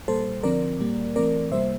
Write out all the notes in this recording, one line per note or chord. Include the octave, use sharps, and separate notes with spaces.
A#2 G3 A#3 A4 C5
D3 F3 C4 A#4 D5
A#2 G3 A#3
E3 A3 C4 A#4 D5
C3 G3 A#3 C5 E5